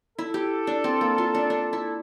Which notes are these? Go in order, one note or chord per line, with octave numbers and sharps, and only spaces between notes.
E4 A4
G4
D4
C4
A#3
F4
D4
D4
E4